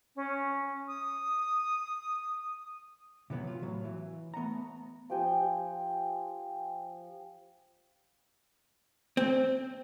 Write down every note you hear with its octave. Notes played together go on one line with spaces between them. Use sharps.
C#4
D#6
C3 E3 F#3 B3
F4
A2 F#3
E3
A3 B3 F#5 A#5
F3 G4 G5 G#5
C4